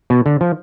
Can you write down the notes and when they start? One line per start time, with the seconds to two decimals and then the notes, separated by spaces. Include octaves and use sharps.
0.10 B2
0.26 D3
0.41 F3